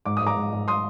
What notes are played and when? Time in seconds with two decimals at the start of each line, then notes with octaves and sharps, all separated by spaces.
0.05 G#2 D6
0.17 G#2 D#6
0.26 A#5 D6
0.37 G#2
0.52 G#2
0.68 C6 D#6